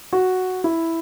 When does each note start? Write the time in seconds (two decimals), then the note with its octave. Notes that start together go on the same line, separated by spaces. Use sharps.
0.13 F#4
0.64 E4